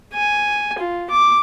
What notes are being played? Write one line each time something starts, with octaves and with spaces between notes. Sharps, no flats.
G#5
F4
D6